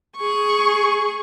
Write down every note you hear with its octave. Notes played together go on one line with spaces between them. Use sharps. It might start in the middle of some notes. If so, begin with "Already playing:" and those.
G#4 C#6